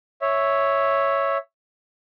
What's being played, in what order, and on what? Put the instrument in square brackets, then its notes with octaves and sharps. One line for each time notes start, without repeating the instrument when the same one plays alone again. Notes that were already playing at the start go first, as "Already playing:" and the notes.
[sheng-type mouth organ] C#5 E5